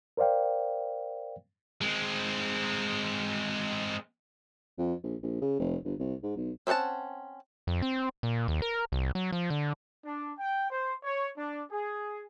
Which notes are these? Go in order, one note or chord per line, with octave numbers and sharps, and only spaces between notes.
A#4 C5 D5 F5 G5
G#3 C4
F2
A#1
A#1
C#3
F1
G1
C2
G#2
B1
C4 C#4 C5 F#5 A5
F2
C4
A#2
D#2
A#4
C2
F#3
F3
D3
D4
G5
C5
C#5
D4
G#4